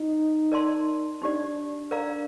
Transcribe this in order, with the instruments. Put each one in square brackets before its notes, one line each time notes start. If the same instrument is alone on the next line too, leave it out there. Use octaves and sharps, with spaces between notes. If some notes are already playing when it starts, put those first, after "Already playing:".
Already playing: [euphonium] D#4
[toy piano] A#4 D5 A5 C6
[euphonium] D4 [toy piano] D#4 G4 D5
[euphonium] D4 [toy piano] A#4 D5 F5 A#5